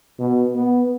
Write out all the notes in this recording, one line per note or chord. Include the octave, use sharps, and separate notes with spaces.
B2
B3